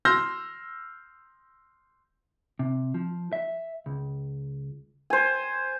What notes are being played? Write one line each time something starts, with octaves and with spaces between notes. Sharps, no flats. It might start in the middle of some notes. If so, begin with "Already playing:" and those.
C6 E6 F6 G6 A#6
C3
F3
E5
C#2
C5 G#5